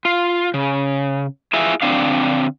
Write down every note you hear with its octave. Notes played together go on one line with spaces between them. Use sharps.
F4
C#3
E4 F4 G#4 E5 G#5
D3 C4 D4 F5